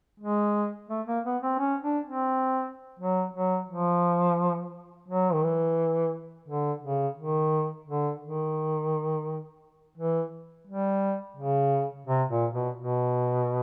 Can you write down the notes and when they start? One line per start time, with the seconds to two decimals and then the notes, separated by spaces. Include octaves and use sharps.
0.20 G#3
0.89 A3
1.07 A#3
1.25 B3
1.42 C4
1.59 C#4
1.83 D4
2.06 C4
2.99 F#3
3.34 F#3
3.69 F3
5.08 F#3
5.33 D#3
5.44 E3
6.48 D3
6.83 C#3
7.18 D#3
7.87 D3
8.22 D#3
9.98 E3
10.68 G3
11.37 C#3
12.07 C3
12.30 A#2
12.53 B2
12.77 B2